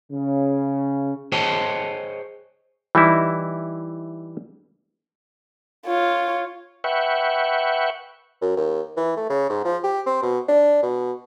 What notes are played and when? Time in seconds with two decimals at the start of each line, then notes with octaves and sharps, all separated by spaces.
0.12 C#3
1.32 G#4 C5 C#5 D#5 G5 A5
2.95 E3 G3 D#4 E4
5.86 F4 C#5
6.84 B4 E5 F#5 G5 C#6
8.42 F#2
8.57 D#2
8.97 E3
9.17 A3
9.30 C#3
9.49 G#2
9.65 F3
9.83 G4
10.06 C4
10.23 B2
10.48 D4
10.82 B2